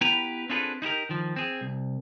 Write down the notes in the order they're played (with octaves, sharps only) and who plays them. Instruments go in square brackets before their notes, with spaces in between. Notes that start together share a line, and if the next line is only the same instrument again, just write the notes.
[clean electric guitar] B3 E4 G4 B4 G5 A#5
C4 D4 F4 G#4 A4 B4
D#4 E4 G4 A#4
D#3 F3
C4 G#4
C2